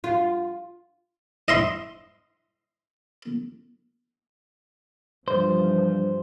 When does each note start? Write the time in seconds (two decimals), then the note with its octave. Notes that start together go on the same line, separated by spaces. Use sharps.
0.04 F4
1.48 D#5 E5 C6
5.28 G2 E3 F3 C5